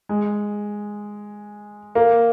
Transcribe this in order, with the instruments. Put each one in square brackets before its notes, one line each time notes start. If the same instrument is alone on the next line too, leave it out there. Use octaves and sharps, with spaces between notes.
[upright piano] G#3
A#3